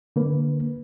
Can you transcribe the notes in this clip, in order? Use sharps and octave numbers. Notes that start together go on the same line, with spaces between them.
D3 A#3 B4